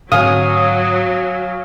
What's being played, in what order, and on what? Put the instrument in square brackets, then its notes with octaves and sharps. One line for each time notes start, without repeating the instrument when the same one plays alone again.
[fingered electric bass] G#2 D3 C4 [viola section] F#3 [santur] F5 G#5 [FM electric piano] D#6